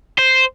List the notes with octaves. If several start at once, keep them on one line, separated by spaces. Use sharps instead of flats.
C5